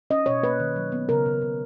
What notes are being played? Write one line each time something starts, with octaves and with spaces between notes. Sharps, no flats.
C#4 D#5
B2 C#5
A#3 B4
D#3
F#3
B3
C#3 A#4
C#3
C#3